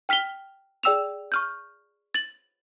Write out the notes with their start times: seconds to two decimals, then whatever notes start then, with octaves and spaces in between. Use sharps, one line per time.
0.09 G5 F6 B6 F7 G7
0.83 G#4 D5 G5 E6 E7 F7
1.32 C#6 F6 G6
2.14 A6 F#7